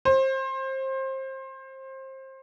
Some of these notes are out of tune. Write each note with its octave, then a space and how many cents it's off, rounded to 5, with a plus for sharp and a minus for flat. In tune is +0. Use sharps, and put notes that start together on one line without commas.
C5 +25